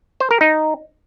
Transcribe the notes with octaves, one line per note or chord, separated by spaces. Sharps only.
C5
A#4
D#4